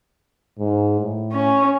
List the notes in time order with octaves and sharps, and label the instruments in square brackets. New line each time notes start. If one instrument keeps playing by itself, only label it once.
[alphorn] G#2
A2
[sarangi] C#4